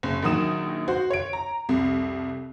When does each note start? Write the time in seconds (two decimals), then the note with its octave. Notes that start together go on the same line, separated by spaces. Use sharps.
0.03 F#1
0.22 A#1 D#3 F#3 D#6 E7
0.88 F#4 C5
1.10 C#5 D7
1.33 A#5
1.69 C2 F2